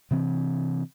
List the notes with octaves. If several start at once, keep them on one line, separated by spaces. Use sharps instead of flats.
C3 E3 C4